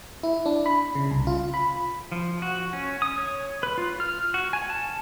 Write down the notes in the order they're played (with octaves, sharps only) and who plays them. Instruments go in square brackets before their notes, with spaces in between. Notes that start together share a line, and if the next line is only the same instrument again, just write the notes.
[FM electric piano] E4
D4
B5
C#3
C2
F4
B5
[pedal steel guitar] F3
F#4
C#4
D#6
C#5
B4
F4
F6
F#4
G#5
A5